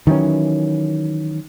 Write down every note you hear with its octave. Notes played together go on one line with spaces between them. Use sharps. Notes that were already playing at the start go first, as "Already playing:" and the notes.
D#3 E3 F#3 C#4